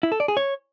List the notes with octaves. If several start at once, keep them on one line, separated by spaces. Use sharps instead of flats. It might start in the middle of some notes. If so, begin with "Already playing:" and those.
E4
A4
D5
G#4
C#5